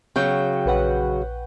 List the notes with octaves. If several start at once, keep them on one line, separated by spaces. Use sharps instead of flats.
C#3 F#3 G5 C#6 G6
A#1 B4 F#5